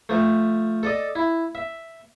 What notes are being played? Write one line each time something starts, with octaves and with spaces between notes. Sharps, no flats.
F3 A3
A4 D5 D#5
E4
E5